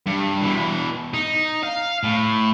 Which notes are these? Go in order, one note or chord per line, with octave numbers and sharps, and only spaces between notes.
G2
B2 E3
D#4
F5
A2